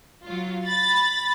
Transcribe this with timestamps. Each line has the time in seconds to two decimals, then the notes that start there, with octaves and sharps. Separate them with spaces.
0.25 F#3 F4
0.67 B5 A6